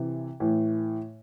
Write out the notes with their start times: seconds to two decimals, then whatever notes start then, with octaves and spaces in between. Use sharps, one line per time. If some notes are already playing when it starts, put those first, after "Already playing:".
Already playing: C3 E3
0.40 A2 E3